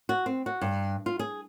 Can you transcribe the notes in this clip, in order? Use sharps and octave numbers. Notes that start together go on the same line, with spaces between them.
F#4
C4
F#4
G2
F4
G#4